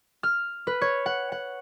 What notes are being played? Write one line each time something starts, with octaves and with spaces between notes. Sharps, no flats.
F6
B4
C#5
F#5
F#5